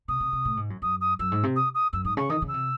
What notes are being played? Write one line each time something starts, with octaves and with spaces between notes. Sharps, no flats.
C3 D#6
C3
C3
A2
G#2
F#2
F#2 D#6
D#6
F#2 E6
G#2
C3
D#6
D#6
F#2 E6
G#2 D#6
C#3 C#6
D#3 D#6
C#3
E6
C3